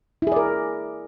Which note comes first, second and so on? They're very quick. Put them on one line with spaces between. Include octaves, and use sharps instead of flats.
E4 G#4 D5 A#4